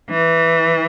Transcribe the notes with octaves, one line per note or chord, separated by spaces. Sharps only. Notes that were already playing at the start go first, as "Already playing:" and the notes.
E3